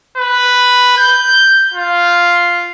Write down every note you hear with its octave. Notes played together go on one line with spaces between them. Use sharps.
B4
G6
F4